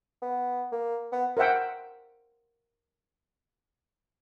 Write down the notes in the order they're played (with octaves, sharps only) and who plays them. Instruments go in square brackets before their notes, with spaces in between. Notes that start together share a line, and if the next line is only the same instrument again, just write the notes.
[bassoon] B3
A#3
B3
[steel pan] A#4 C5 E5 F#5 G5